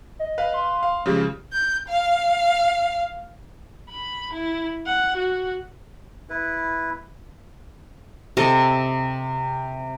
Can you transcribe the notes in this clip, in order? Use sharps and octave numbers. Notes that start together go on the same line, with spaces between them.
D#5
B4 F5
C6
F5
C#3 F3 G#3 G4
G6
F5
B5
E4
F#5
F#4
E4 B4
C3 A4 D#5